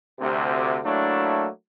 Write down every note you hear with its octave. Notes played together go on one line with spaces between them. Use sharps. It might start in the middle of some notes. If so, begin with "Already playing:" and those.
D2 C3
F#3 A3 A#3 D4 E4